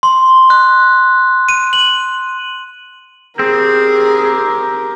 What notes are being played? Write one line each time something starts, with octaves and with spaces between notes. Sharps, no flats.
C6
F#6
D#7
F#7
C4 G4 G#4 A#4